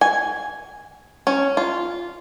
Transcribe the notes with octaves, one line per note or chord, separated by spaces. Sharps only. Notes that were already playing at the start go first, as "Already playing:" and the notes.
G#5
C#4
F4